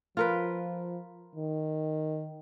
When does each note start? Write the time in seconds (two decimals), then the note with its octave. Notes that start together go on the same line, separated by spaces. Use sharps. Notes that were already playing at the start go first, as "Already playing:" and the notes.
0.17 F3 F4 A#4 B4
1.36 D#3